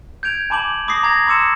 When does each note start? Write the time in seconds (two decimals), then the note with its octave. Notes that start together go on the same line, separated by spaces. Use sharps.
0.23 G6 G#6 D7 F7
0.50 G#5 A5 B5 D6 G6 F#7
0.88 B5 D6 D#6 A#6 C7
1.03 A#5 G#6 A#6
1.27 B5 C6 D6 E6 C#7 E7